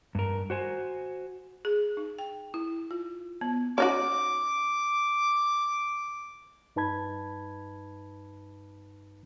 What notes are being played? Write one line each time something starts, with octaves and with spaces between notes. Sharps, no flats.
G2 A#4
F#4 C5 G#5
G#4
D#4
G5
E4
F4
B3
C#4 D#4 F#4 D6
G2 D#4 B4 A5 B5 G#6